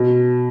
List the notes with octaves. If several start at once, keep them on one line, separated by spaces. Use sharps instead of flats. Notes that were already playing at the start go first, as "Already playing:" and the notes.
Already playing: B2